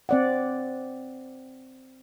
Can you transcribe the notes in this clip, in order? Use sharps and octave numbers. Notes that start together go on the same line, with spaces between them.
C4 D5 F#5